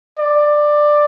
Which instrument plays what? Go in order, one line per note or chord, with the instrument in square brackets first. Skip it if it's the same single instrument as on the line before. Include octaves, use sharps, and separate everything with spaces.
[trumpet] D5